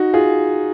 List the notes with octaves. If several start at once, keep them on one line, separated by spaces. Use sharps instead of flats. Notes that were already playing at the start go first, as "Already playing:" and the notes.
Already playing: D#4 F#4
F4 G#4